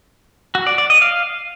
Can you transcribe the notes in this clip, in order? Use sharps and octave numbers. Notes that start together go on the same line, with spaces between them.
F#4
D5
D5
D#5
F5